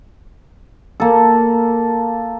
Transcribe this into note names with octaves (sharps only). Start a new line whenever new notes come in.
A#3 A4